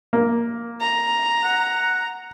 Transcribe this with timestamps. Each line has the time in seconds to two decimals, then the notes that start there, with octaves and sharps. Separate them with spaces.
0.13 A#3
0.81 A#5
1.44 F#5